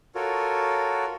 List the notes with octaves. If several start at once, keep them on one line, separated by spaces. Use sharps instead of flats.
F4 F#4 A4 A#4 C#5